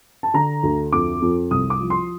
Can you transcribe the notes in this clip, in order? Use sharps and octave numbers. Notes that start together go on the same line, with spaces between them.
A5
D3 A#5
D2
F2 D6
F2
C2 D#6
D6
F3
C6